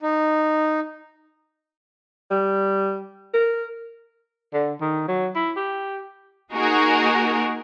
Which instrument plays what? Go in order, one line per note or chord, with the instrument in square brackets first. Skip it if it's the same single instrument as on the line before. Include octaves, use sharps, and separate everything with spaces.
[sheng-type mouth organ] D#4
[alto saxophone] G3
A#4
[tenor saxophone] D3
D#3
F#3
E4
G4
[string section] A#3 D#4 F#4 G#4 A#4